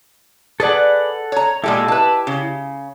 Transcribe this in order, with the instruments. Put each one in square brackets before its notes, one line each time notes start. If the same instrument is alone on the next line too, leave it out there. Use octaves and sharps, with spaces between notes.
[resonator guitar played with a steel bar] G#4 B4 D5 [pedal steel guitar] A4 F#5
[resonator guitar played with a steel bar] C#5 A#5
[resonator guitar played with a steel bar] A#2 G#3 A4 [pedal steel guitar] E4 G4
[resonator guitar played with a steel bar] B4 A5
C#3